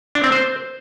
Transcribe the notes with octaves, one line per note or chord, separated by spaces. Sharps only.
D4
C4
C5